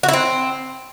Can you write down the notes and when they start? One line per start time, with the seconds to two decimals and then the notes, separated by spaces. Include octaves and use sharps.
0.03 F#4
0.08 E4
0.13 C4